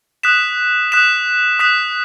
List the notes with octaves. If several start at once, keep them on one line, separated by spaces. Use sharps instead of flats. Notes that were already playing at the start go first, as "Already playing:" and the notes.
D#6 F#6 B6 E7
D#6 F#6 B6 E7
D#6 F#6 B6 E7